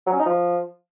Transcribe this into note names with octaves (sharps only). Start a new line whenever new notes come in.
F#3
C#4
D#4
F3